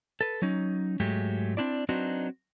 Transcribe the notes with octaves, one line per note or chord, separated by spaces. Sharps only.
A4 B4
F#3 C#4 D#4
G#2 F#3 G#3 A3 G4
C4 D4 E4 D5
F#3 C4 D4 D#4 F#4 B4